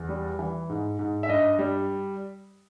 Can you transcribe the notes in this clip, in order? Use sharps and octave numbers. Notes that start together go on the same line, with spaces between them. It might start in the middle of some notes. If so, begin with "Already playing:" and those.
Already playing: E2
G3
E3
G#2
G#2
E5
G2 D#5
G3